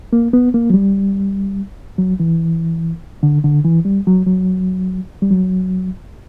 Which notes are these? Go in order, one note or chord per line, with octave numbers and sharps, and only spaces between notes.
A#3
B3
A#3
F#3
G3
F#3
E3
D3
D3
E3
G3
F#3
F#3
G3
F#3